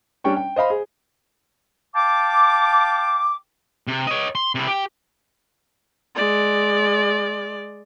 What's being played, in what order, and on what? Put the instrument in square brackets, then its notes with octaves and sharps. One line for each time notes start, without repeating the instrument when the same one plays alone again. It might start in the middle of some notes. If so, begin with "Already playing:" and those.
[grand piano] G3 C#4 D4 G5 C#6
G5
C5 D#5 F5 B5
G#4
[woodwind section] F5 G5 A5 D6
[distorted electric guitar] C3
C#5 D#5
C6
C3 E4
G4
[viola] G#3 D5